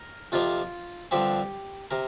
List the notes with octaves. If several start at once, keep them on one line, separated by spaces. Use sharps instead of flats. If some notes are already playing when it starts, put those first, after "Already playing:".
Already playing: A#4
F2 C3 F3 A#3 F4
G2 D3 F3 C4 G4
C3 A#4